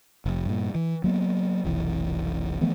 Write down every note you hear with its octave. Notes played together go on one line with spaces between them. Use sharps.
F1
G2 A#2
E3
F#3 G#3 A#3 B3
F1 B1 E3
E3 F3 A3 B3